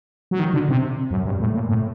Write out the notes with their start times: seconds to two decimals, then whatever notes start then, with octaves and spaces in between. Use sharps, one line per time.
0.31 F#3
0.39 D#3
0.54 D3
0.69 C3
1.11 F#2
1.25 G2
1.40 A2
1.54 A#2
1.69 A2